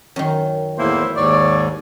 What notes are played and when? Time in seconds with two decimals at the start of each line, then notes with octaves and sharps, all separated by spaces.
0.16 F#2 D#3
0.78 E2 A2 A#3 E4 C5
1.17 D#2 G#2 C#5 D5